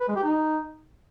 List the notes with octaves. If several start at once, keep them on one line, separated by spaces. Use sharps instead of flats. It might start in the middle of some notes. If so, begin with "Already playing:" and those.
B4
G#3
G4
D#4